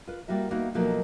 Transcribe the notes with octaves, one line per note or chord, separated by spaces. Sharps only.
F4 B4
G3 A#3 E4 F#4 E5
A#3 B3 D#4 E4 F#4
B2 F3 F#3 A3 A#3 D#4